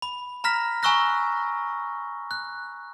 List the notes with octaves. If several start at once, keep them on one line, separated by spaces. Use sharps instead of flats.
B5
A#5 B5 F6 A#6 B6
G#5 A#5 C#6 E6 F#6 A#6
F#6